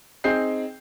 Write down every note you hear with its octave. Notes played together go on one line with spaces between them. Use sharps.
C4 D#4 G#4 G5 G6 C7